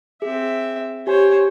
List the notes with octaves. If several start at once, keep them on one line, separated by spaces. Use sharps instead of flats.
C4 G#4 E5
G4 C5 C#5 G#5